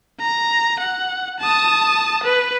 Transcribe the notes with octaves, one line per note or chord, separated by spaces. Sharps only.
A#5
F#5
A5 D#6
B4